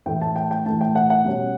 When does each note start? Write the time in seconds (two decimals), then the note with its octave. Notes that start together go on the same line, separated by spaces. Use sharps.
0.06 A2 E3 A3 G5
0.21 A5
0.36 G5
0.51 G5
0.66 A2 E3 A3 A5
0.81 G5
0.95 F#5
1.10 F#5
1.25 B2 G3 C#4